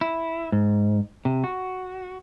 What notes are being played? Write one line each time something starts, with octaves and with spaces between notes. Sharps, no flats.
E4
G#2
C3
F#4